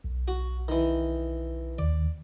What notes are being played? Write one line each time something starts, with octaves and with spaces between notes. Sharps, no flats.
B1
F#4
D#3 E3
D#2 D#3 D5